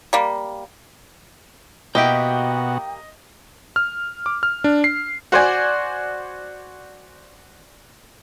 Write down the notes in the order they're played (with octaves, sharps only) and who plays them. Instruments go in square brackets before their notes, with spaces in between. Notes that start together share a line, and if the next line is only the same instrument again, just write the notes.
[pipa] G3 A#3
[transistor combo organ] B2 F#4 [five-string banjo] A#3 E4 G4 [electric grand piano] D#5 [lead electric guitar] G5
[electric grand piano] F6
D6
F6
D4
C7
[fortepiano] F#4 C5 D5 G#5